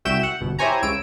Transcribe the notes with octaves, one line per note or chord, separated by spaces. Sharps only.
C2 F#4 E5 G5 G6 E7
F#5
G1 B2
E4 G4 C5 C#5 G#5 A#5
C#2 E6 D7